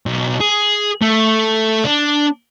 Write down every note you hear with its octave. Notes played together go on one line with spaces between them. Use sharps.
B1
G#4
A3
D4